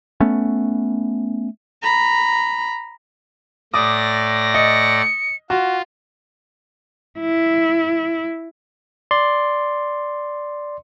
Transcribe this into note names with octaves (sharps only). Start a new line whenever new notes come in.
A3 B3 C#4
A#5 B5
A2 D5 D6 D#6 A#6
D#5 C#7
F4 F#4
E4
D5 C6